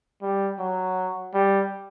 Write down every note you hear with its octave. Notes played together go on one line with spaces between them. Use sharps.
G3
F#3
G3